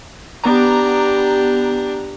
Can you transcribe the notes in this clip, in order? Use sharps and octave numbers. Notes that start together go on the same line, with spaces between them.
B3 D4 G4 A#5